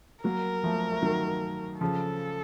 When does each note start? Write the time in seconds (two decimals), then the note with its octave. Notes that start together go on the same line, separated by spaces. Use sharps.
0.24 F#3 A#3 A#4
0.63 F3 A3
0.92 A3
1.03 D#3 F#3
1.81 C#3 F3 A4